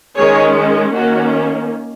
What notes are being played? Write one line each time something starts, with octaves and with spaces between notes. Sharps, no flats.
D#3 G#3 C#4 G#4 C#5
D#3 A#3 C#4 F#4